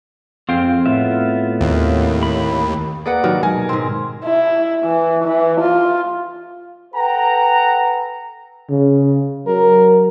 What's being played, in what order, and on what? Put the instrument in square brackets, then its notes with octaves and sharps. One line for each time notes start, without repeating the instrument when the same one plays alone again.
[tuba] F2 [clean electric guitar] C4 G#4 F5 [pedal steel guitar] F4 G5
[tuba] A2 [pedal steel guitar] B3 F4 E5
[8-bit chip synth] D#2
[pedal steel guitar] B5
[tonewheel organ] A#3 D5 [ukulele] G#4 B4 F#5
[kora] D#3 [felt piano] F#3
[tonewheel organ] B2 G#3 A#4 [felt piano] G#5
[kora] G#2 C4
[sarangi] E4
E3
E3
F4
[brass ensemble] A4 B4 F#5 G5 A#5
[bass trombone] C#3
[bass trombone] F#3 [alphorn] A#4